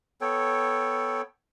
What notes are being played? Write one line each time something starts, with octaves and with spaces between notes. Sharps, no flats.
B3 A4 C#5 G5